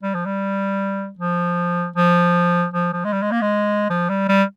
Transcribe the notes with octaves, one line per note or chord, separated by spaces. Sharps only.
G3
F3
G3
F3
F3
F3
F3
G#3
G3
G#3
A#3
G#3
F3
G3
G3